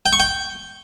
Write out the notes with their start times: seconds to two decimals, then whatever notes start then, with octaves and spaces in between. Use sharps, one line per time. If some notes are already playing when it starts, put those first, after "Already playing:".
0.06 G5
0.13 C#6
0.20 G5